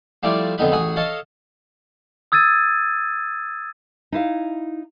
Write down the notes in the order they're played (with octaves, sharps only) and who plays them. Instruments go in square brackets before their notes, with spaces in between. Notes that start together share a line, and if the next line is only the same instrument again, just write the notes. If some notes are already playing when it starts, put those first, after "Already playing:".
[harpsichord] F3 G3 A3 E4 D5
F2 D3 B3 D#4 B4
A1 F#4 G#4 D#6
A4 C#5 D#5 F5 A5
[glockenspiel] D#6 E6 G#6 A6 D#7
[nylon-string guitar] D#4 E4 F5